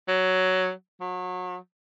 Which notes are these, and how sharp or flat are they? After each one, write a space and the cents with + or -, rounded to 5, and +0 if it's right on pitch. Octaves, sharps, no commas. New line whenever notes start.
F#3 +10
F#3 -30